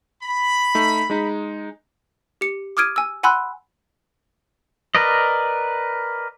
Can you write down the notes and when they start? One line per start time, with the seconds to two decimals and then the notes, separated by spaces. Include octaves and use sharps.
0.23 B5
0.75 A3 D#4
1.10 G#3 D#4
2.41 G4 C#7
2.77 D6 D#6 F6 G#6 D7 D#7
2.96 G#5 E6
3.23 F#5 G#5 B5 C6 E6 F#6
4.95 A#4 B4 D5 D#5